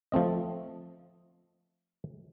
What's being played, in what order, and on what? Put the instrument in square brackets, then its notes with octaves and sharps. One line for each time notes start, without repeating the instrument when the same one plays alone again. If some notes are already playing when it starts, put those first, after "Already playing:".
[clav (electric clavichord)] F3 A3 C4 D#5